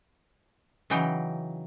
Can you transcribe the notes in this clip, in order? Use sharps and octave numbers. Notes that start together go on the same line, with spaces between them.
C#3 E3 F#3 D#4 G5